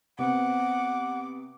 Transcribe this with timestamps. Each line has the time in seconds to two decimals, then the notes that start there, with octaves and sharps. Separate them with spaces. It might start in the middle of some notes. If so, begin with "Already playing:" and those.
0.18 C3 B3 C4 F#5 D6